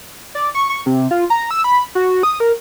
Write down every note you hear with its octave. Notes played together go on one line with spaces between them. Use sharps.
D5
C#6
C#6
C3
F4
A#5
E6
B5
F#4
D#6
A#4